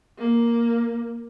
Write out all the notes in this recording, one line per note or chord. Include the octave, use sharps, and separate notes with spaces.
A#3